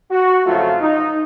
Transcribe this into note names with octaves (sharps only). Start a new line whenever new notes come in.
F#4
F2 C#3 F#3 A3 F4
D#4